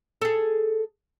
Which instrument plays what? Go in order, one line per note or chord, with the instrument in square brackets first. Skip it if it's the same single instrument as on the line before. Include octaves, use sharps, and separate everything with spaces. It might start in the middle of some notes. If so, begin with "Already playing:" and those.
[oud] G#4 A4